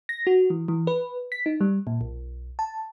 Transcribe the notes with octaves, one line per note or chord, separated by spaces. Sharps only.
A#6
F#4
E3
E3
B4
B6
D#4
G3
A#2
B1
A5